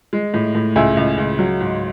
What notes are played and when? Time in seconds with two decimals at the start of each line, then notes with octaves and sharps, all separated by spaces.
0.13 G#3
0.34 A2
0.55 A2
0.76 C#2 E5 G#5
0.97 C#2
1.18 C#2
1.39 F#3
1.60 G#2